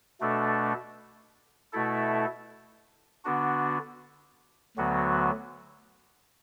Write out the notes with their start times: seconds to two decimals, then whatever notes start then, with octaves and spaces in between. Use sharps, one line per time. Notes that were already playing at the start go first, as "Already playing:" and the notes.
0.21 B2 A3 D4 A4
1.72 B2 A3 E4 A4
3.25 D3 B3 D4 F#4
4.77 D2 D3 F#3 B3 F#4